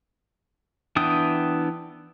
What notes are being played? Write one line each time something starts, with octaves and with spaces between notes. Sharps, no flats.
E3 B3 D4 G5 D#6